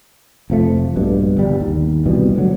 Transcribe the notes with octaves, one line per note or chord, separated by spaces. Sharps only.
F1 F3 A3
A#1 G2 B2
G1 G3
D#2
C2 B2 E3 G3
D2 F#3